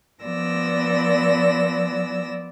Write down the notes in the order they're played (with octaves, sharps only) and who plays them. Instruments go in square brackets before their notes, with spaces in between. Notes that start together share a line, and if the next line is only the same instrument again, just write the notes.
[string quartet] F3 B3 D5 E6 A#6